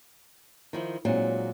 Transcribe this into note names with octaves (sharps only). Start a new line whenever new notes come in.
D#3 F3 E4
A#2 F#3 G#3 C4 D#4